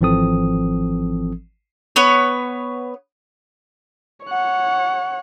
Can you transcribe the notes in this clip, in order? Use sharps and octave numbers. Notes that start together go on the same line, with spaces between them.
G#1 E3 F3 C4 A4 D#6
B3 C#5
C#5 F#5